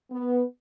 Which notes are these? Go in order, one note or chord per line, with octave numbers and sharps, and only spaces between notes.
B3